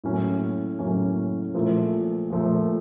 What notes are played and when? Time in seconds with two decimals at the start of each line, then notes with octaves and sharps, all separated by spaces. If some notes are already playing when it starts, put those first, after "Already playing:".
0.04 A2 F#3 A#3 C#4
0.79 A2 F#3 A#3 C#4
1.54 A#2 F3 A3
2.30 A#2 F3 A3